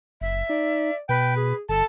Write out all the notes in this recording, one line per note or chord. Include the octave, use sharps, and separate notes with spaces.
F#1 E5
D#4 D5
B2 B4 G5
G#4
G1 A4 A5